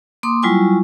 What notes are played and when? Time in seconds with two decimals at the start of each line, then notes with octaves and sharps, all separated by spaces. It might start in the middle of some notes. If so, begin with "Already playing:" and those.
0.23 A#3 C6 D6 D#6
0.43 F#3 G3 E4 F4 G#5 C#6